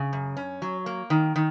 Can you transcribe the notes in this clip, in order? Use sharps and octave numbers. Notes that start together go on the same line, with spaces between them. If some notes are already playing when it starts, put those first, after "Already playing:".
Already playing: C#3
F#2
C#4
F#3
A#3
D#3
D#3